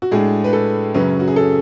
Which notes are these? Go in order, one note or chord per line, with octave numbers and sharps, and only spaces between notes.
F#4
A2 G#3 D4 G#4
B4
A4
F#2 C#3 F#3 C#4 B4
F#4
G#4
A4